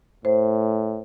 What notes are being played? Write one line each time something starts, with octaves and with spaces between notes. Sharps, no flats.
A2 C5